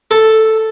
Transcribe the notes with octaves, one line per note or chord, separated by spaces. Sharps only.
A4